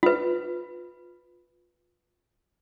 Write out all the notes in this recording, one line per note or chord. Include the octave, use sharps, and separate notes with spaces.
F4 B4